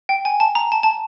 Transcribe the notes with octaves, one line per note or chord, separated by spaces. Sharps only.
G5
G#5
A5
A#5
A5
A5